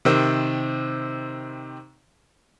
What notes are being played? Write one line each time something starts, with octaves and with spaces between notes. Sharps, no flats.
C3 D#3 C4